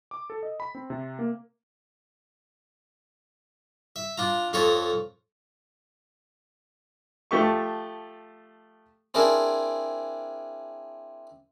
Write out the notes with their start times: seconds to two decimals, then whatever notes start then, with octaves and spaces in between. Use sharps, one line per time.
0.11 D6
0.30 A4
0.43 D#5
0.60 B5
0.75 C4
0.90 C3
1.19 A#3
3.96 E5
4.17 D4 F4 A#5
4.53 F2 F4 A4 C#5 A#5 D#6
7.31 F3 A3 G4 C#6
9.14 C4 D4 E4 G#4 A#4 C5